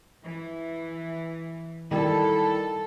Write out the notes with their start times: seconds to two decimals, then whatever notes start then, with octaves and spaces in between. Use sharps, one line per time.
0.24 E3
1.91 D#3 G3 E4 A4